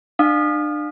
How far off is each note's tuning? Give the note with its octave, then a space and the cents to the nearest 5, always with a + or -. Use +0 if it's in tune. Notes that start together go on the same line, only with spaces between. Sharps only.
D4 +35 F5 +15 D#6 -30